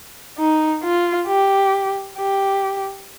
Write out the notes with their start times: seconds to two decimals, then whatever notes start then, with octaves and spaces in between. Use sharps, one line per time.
0.38 D#4
0.84 F4
1.27 G4
2.18 G4